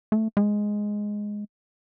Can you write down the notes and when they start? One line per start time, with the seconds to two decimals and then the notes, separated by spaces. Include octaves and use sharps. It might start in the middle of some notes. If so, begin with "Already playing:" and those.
0.12 A3
0.37 G#3